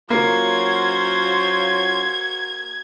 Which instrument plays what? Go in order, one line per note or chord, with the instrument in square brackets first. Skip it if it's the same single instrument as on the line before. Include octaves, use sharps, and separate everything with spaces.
[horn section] F#3 C#4 F4 [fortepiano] A#3 [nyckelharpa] F#4 C5 [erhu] G#6